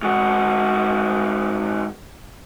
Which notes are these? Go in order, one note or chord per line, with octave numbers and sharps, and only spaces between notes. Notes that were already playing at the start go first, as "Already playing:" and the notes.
G#2 F#4